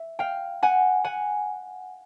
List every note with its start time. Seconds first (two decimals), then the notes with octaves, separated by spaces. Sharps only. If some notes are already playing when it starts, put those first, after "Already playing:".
Already playing: E5
0.19 F5 G5
0.63 F#5 G#5
1.04 F#5 G#5